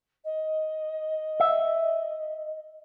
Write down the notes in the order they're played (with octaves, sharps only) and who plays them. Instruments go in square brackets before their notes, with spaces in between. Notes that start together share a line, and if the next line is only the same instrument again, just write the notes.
[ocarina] D#5
[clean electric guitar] E5